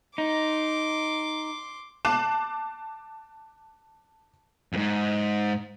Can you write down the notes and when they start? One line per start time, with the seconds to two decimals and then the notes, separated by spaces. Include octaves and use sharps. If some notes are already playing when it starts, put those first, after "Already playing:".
0.18 D#4 C6 D6
2.05 A5 D6 F#6 C7 E7
4.73 F2 G#2